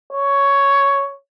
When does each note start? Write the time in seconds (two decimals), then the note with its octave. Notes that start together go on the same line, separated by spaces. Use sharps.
0.13 C#5